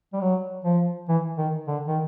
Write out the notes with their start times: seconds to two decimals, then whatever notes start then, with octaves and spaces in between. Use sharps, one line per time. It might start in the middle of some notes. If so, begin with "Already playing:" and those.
0.13 G3
0.21 F#3
0.64 F3
1.09 E3
1.38 D#3
1.67 D3
1.87 D#3